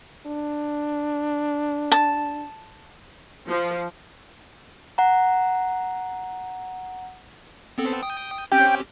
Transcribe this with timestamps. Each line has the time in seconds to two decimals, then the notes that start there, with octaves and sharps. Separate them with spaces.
0.26 D4
1.91 A5
3.48 F3
4.98 F#5 A#5
7.78 B3 C4 A4
8.03 G5 D#6
8.52 C4 C#4 G4 G5